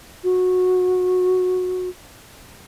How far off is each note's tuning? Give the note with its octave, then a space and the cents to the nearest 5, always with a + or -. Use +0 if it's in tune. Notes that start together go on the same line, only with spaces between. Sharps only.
F#4 -15